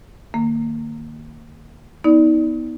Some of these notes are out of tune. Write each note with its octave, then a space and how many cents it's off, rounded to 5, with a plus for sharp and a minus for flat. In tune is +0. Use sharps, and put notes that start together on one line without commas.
D#3 -25 A#3 -20
B3 +0 D#4 +30 D5 +0